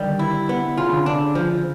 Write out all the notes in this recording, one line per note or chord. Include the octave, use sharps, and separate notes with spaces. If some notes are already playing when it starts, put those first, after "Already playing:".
Already playing: D3 D#3 G3
E4
B3
C#3 F4
D3
C#3
D4
F3